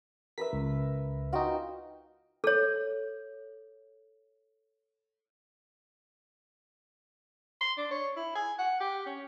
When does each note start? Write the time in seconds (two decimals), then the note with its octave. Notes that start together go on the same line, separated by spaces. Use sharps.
0.38 A#4 B4 E5 B6
0.53 C#2
1.33 D#4 F4 F#4 F5 G5
2.44 A4 C#5
7.61 C6
7.77 D4
7.91 C#5
8.17 E4
8.35 G#5
8.59 F#5
8.80 G4
9.06 C#4